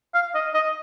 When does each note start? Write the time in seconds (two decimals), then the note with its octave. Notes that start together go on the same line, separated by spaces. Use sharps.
0.14 F5
0.34 D#5
0.54 D#5